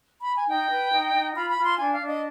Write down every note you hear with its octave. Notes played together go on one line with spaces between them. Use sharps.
B5
G#5
D#4 G5
B4
D#4
D#4
F4 B5
B5
F4
C6
D4 G#5
F5
D4
D#5